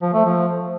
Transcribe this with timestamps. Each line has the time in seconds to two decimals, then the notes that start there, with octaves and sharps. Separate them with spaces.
0.02 F3
0.14 A3
0.25 F3